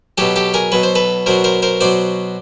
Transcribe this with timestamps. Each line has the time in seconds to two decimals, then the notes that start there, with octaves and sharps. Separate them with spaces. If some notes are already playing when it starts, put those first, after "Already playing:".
0.18 B2 F#3 G4 A4
0.36 G4 A4
0.54 G#4 A#4
0.72 B2 F#3 B4
0.83 C5
0.95 A4 B4
1.26 B2 F#3 A#4 C5
1.44 A#4 C5
1.62 A#4 C5
1.81 B2 F#3 C5 D5